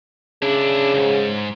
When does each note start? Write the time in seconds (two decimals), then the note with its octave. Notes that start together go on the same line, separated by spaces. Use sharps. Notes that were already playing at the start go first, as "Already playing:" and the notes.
0.42 C#3 D4 E4
0.94 C2 G#2